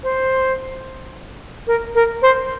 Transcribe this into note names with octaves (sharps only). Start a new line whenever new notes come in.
C5
A#4
A#4
C5